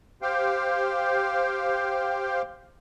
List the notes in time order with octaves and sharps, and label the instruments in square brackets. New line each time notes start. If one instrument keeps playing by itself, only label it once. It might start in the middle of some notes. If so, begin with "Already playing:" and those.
[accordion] G4 C5 F5 G5